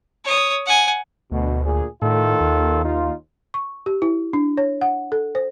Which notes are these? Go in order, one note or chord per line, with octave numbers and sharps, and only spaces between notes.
C#5 D#6
F#5 G#5
D2 B2
A#2 G#4
A2 D#3 F4 A4
D#2
D#4 F4
C#6
G4
E4
D4
C#5
F#5
A4
C5